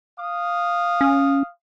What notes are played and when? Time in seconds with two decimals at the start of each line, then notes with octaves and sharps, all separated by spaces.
0.19 F5 D#6
1.01 C#4